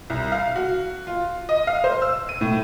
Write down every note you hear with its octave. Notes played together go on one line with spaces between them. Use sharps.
C2
F5
F#4
F4
D#5
F5
C5
E6
D#7
A2